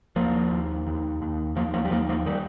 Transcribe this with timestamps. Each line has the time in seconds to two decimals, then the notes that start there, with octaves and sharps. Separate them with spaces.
0.16 D#2 F3 A#3
0.51 D#2
0.87 D#2
1.22 D#2
1.56 D#2 F3 A#3
1.74 F3 A#3
1.85 G3
1.91 D#2 F3 A#3
2.09 F3 A#3
2.26 D#3 G3